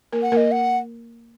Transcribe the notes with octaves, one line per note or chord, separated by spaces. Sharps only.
A#3 A#4
F#5
A#3 A#4 D#5
F#5